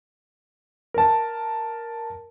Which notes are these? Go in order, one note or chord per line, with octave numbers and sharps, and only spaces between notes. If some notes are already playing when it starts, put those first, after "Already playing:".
A#4 A5